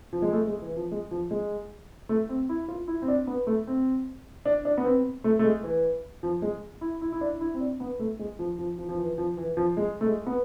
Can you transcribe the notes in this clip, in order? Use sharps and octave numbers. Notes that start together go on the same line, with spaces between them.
F3
G#3
A3
G#3
E3
F3
G#3
F3
G#3
A3
C4
E4
F4
E4
C4
D4
B3
A3
C4
D4
D4
B3
C4
A3
A3
G#3
E3
F3
G#3
E4
E4
E4
D4
E4
C4
D4
B3
A3
G#3
F3
F3
F3
F3
E3
F3
E3
F3
G#3
A3
G#3
B3